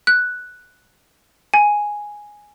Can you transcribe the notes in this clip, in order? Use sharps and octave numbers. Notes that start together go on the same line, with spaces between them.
F#6
G#5